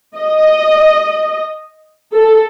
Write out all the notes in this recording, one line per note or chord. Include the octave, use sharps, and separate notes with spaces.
D#5
A4